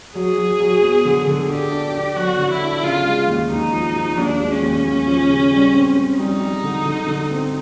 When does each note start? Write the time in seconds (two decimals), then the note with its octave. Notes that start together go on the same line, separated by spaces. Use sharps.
0.15 F#3 G#4
0.38 F#3
0.60 F#3
0.82 B3
1.05 D3
1.27 D3
1.49 D4 G4
1.72 D4
1.94 D4
2.16 F#3 F#4
2.39 D3
2.50 E4
2.60 D4
2.83 C#3 F4
3.05 G#3
3.28 D#2
3.50 D#2 D#4
3.72 F3
3.96 F3
4.17 D#2 D4
4.40 G#3
4.51 C#4
4.62 D#2
4.85 D#2
5.07 F3
5.29 C#3
5.52 G3
5.74 C4
5.96 C4
6.19 G3 D#4
6.41 G3
6.63 D3
6.85 D3
7.07 D3
7.31 C4